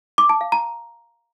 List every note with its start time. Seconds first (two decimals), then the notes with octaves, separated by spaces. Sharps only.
0.18 D6
0.29 A5
0.41 F5
0.52 A#5